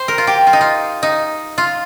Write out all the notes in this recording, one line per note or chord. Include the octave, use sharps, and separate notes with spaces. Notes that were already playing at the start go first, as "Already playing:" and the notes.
Already playing: C5
A#4
F4
G4
F4
D#4
F4
D#4
F4